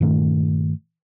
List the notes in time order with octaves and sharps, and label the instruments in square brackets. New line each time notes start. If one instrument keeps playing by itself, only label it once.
[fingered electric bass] G2 A#2 D#3 A3